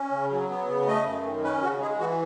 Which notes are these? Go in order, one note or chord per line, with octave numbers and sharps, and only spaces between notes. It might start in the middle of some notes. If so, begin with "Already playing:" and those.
Already playing: C#4
C#3
F#3
B3
C#3
A3 D#5
F#2
D#3
C#4 B4
C#3 F#4
G#3 G#4
E3 F#4